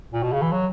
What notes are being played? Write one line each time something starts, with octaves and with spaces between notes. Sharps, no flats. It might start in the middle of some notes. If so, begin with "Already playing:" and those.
A#2
B2
C#3
E3
F#3